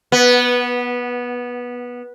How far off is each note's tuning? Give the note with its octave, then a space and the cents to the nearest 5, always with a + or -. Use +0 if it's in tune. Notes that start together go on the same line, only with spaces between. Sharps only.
B3 -15